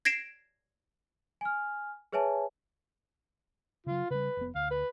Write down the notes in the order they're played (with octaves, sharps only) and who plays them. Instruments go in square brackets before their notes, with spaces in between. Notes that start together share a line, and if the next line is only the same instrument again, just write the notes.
[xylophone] G#6 A#6 C7 D7 E7
[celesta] G#5 F6
G#4 B4 C#5 E5 G#5 A5
[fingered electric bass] C#3 F#3 [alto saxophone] F4
[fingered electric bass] C#3 G3 [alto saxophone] B4
[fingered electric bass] F1 B3
[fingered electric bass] D2 [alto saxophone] F5
[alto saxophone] B4